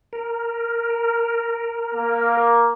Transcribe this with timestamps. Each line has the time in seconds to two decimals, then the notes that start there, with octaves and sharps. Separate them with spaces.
0.13 A#4
1.94 A#3